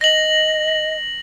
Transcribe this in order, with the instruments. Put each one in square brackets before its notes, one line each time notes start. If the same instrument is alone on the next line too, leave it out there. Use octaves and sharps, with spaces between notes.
[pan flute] D#5 [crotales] A#6 F#7